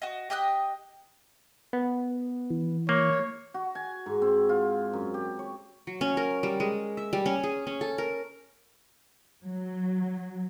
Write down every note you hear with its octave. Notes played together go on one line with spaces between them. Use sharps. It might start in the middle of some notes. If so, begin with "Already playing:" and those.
F#4 D#5
G4 D#5 D#6 F#6
B3
E3
A#3 C#5
F#4
G#5
G#2
C4
F4
F#2
G4
C#5
F#3
C#4
A#4
G3
G#3
E5
G3
C#4
G#4
C#4
A4
A#4
F#3